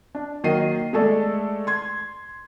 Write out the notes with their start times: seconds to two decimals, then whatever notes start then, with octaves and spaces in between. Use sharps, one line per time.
0.15 D4
0.44 D#3 F#3 A#3 D#5 C7 D#7
0.93 G#3 A3 A4 D5
1.67 C6 G#6